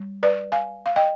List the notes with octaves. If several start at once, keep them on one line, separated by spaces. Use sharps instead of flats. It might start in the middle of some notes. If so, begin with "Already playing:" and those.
Already playing: G3
B4 D5
F5 G#5
F5
D#5 G5